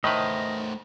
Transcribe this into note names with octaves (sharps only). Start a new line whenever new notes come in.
A2 D#3 A3 B4 C5 D#5